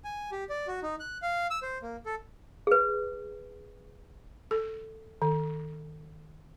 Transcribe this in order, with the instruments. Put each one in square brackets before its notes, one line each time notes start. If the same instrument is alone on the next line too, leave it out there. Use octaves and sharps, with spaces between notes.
[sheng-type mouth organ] G#5
G4
D5
F#4
D#4
F#6
F5
E6
C5
A#3
A4
[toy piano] G#4 B4
[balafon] A4
D#3